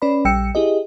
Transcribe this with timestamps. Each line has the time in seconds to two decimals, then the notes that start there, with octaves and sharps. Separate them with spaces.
0.02 C#4 B4 D5 B5
0.25 A#1 G3 G5 E6 C#7
0.55 E4 G4 G#4 D#5